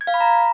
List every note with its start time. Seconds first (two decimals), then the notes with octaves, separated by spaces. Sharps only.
0.01 G#6
0.07 F5
0.14 B5
0.21 A#5